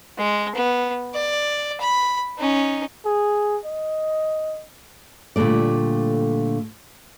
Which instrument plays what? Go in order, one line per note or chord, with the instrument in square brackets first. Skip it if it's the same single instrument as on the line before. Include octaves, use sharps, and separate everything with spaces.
[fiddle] G#3
B3
D5
B5
C#4 D#4
[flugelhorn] G#4
D#5
[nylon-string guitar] A#2 D3 G3 A3 D5